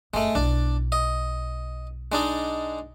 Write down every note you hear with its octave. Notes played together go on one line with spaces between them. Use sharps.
F#1 G#3 A3
B1 D4 E4
D#5
G#3 D4 D#4